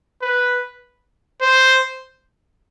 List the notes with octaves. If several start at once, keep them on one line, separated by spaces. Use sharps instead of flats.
B4
C5